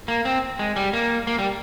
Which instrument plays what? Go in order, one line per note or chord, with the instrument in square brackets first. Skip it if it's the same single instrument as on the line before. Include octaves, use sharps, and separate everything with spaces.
[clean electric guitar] A#3
C4
G#3
G3
A#3
A#3
G3